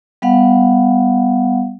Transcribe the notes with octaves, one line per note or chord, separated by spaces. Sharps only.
G3 B3 F5 F#5